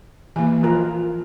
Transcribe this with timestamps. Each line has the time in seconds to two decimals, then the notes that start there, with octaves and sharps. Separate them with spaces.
0.36 E3 A#3 G#5
0.63 F3 F4 A#4